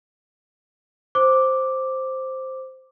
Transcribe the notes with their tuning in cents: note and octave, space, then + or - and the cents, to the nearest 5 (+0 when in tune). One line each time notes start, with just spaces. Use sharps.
C5 +0 D6 +0